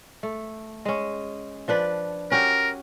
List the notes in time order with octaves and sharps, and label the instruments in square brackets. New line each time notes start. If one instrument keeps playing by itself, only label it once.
[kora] A3
G#3 C#4
F3 D4 B4
[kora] C#4 F#4 G4 [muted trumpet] A#4